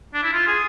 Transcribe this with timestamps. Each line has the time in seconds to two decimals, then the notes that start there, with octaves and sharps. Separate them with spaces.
0.14 D4
0.24 E4
0.33 F4
0.48 G#4